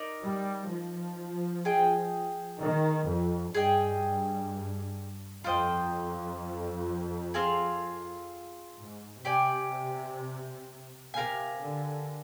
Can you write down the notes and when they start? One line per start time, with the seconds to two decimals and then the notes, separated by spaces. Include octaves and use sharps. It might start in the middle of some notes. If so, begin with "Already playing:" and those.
Already playing: D#4 A#4 D5
0.23 G3
0.70 F3
1.65 G#4 D#5 G5
2.61 D#3
3.07 F2
3.54 G2 G#4 D#5 G5
5.44 F2 F4 C5 D#5 G5
7.34 C4 F4 G#4
8.77 G#2
9.24 C3 G4 D5 G#5
11.14 C3 G4 A#4 F5 G#5
11.62 D3